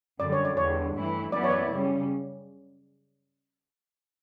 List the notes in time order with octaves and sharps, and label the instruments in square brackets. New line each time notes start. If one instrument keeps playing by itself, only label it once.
[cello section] F#2 D3 G3 [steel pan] D5
[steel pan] C#5
D5
[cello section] E2 D3 G3 [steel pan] C#5
[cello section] G2 E3 A3 E4
[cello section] F#2 E3 B3 E4 [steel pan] D5
[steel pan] C#5
D5
[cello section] C#3 G3 C#4